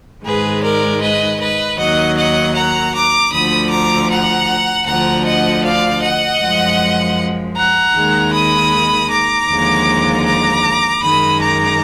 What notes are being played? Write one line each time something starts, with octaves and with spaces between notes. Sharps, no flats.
G#2 D#3 G#3 G#4 B4
A#4 D5
B4 D#5
B4 D#5
D#2 D#3 F#3 D#5 F#5
D#5 F#5
F#5 A#5
A#5 D6
D2 D3 F3 B5 D#6
A#5 D6
F#5 A#5
D2 D3 F3 F#5 A#5
D#5 F#5
D5 F5
D#5 F#5
F#2 F3 G#3
F#5 A#5
D#2 D#3 G#3
B5 D#6
A#5 D6
D#2 D3 F3 G#3
A#5 D6
F#2 D#3 G#3 B5 D#6
A#5 D6